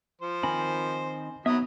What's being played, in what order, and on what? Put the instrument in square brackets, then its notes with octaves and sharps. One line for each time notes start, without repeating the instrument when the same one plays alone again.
[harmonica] F3 C5
[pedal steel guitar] D#3 C4 B5 [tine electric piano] G#5
[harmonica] D#3 F#3 D#6 [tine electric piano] B3 [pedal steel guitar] E5 B5